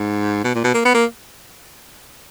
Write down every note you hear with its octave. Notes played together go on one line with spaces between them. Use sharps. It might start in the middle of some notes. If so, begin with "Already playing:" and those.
Already playing: G#2
B2
A#2
B2
A#3
B3
A#3